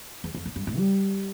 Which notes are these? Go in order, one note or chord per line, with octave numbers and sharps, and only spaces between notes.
E2
F2
A#2
G2
A2
G3